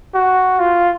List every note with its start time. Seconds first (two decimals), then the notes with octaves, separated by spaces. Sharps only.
0.14 F#4
0.59 F4